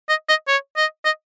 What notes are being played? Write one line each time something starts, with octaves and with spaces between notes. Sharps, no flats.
D#5
D#5
C#5
D#5
D#5